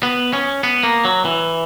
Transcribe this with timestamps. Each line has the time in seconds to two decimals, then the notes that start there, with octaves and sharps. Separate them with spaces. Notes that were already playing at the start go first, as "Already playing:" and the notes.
0.03 B3
0.33 C#4
0.63 B3
0.83 A#3
1.05 F#3
1.25 E3